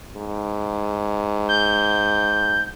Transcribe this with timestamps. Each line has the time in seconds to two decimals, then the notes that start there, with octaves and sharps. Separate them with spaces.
0.17 G#2
1.49 G6